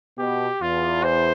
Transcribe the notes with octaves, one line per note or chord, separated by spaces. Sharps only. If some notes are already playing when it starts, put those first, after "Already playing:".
B2 G4
E2 F4
C5